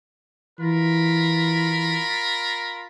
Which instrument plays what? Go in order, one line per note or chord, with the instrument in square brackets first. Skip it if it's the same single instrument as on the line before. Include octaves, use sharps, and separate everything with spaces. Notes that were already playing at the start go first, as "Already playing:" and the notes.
[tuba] E3 [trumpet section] F4 A#4 B5